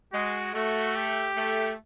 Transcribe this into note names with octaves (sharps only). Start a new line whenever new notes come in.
G#3 F#4
A3 F#4
G4
A3